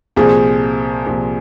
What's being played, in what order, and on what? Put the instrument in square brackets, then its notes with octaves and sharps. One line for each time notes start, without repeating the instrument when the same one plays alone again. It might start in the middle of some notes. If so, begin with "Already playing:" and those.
[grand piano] C2 A#2 F3 [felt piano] G#4
[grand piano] C2 A#2 F3